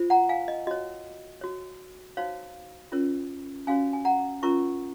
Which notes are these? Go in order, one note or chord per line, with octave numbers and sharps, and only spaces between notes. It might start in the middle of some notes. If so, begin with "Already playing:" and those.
Already playing: F4 C5
F#5 A#5
F5 G#5
D#5
F#4 C#5 D#5
F#4 C#5
D#4 F#4 C5 C#5 F5
C#4 F4 A#4 C#5
C#4 F#4 C#5 F5 G#5
G#5
F#5 A#5
C#4 F4 A#4 C#5 A#5 C#6